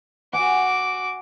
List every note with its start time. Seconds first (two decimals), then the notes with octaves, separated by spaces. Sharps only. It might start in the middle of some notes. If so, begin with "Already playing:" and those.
0.33 F#4 F#5 G#5 D6